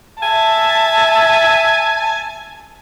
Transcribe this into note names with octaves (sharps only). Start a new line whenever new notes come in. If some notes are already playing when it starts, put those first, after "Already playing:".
E5 G#5 A5